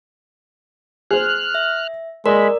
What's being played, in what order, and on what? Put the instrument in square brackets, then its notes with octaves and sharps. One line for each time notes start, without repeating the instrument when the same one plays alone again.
[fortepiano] G#4 C5 [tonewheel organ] F6 F#6
[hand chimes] E5
[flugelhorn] G#3 [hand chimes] A#4 D5 [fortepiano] D#5 C6 [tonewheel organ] B5